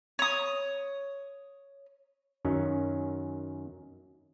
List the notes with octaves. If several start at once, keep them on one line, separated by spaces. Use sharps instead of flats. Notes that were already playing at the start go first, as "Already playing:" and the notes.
C#5 D#6
F#2 D#3 F#3 C#4